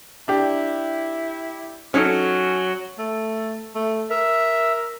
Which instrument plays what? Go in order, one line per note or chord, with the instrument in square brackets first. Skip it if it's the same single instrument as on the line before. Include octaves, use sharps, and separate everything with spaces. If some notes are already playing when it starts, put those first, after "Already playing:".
[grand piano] D4 G4 [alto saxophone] E4
[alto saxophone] F#3 [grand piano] C#4 D#4 A4
[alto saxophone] A3
A3
[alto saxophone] A#4 [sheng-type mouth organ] E5